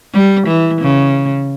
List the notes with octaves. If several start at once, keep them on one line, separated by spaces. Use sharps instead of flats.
G3
E3
C#3